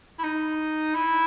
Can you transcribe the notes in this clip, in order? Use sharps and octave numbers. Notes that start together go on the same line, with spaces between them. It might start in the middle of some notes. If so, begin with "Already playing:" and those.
E4
D#4
E4